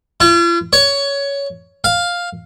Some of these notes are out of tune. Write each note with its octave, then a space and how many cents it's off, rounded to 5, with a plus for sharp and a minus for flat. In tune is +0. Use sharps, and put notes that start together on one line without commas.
F4 -45
C#5 +15
F5 +5